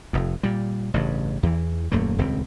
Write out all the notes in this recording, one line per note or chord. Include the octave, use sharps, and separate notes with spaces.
F1 F2
A#2 G3
A1 G2 C#3
E2 E3
D#1 F#2 A3 A#3
D#1 C#2 C4